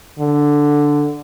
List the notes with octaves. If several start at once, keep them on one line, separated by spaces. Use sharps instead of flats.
D3